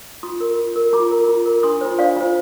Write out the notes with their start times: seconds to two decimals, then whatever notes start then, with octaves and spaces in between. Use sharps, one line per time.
0.23 F4 C6 D#6
0.40 A#4
0.58 F4
0.76 A#4
0.93 F4 A#5 D6
1.11 A#4
1.28 F4
1.46 A#4
1.63 D4 C6 D#6
1.81 F4 C5
1.99 D4 D5 F5
2.16 F4 C5